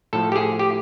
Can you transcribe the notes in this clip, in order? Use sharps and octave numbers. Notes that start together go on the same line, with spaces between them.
A2 F3 A4
G4
G#4
G4